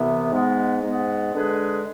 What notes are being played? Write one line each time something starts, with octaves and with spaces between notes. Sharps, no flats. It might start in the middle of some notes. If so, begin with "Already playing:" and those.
Already playing: C2 C3 E3 B3 E4
G#2 G#3 B3
G#2 G#3 B3
D3 G#3 D4 G#4 B4